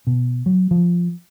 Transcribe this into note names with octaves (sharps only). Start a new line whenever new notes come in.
B2
F#3
F3